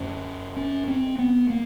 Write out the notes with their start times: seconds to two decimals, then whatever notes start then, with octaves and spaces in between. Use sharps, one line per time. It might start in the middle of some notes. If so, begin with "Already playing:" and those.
Already playing: F#2 D3 C#4
0.56 C#4
0.88 C4
1.19 B3
1.50 A#3